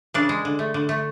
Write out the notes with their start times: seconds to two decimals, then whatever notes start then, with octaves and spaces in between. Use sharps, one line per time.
0.14 C#3 D4
0.29 G#3
0.45 D3
0.59 A3
0.74 D3
0.89 A3